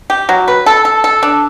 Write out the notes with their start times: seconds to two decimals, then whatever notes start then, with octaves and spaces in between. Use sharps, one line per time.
0.10 G4
0.29 F#3
0.48 B4
0.66 A4
0.85 A4
1.04 A4
1.23 D4